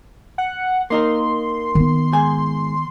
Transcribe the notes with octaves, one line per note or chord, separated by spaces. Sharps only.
F#5
A#3 D#4 A#4 C6
D#3 B3
G#2 G#5